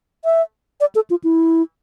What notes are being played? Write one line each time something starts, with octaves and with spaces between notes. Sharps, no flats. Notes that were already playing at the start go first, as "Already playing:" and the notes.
E5
D5
A4
F4
E4